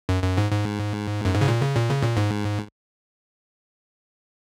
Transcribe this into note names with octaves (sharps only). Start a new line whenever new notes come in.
F#2
F#2
G#2
G#2
F#2
G#2
C#3
A#2
C#3
A#2
C#3
A#2
G#2